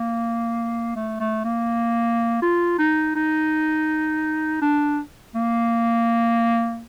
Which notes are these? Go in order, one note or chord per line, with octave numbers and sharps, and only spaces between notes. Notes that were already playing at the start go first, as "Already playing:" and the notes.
Already playing: A#3
A3
A3
A#3
F4
D#4
D#4
D4
A#3